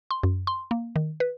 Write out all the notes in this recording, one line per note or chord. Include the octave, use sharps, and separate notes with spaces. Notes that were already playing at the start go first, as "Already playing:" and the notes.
C6
F#2
C6
A#3
D#3
B4